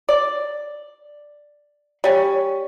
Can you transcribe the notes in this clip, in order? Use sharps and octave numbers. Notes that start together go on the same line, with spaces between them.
D5
G3 C#4